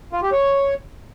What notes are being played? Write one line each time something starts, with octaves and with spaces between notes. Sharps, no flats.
F4
G4
C#5